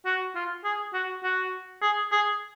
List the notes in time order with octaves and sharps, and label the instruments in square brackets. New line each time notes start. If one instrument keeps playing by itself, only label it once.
[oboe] F#4
F4
G#4
F#4
F#4
G#4
G#4